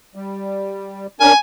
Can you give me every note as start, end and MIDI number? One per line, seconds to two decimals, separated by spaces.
0.15 1.07 55
1.20 1.33 61
1.20 1.33 62
1.20 1.33 70
1.20 1.37 80